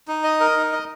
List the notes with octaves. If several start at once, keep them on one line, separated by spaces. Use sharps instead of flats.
D#4
D#5
A#4
D#4
D#5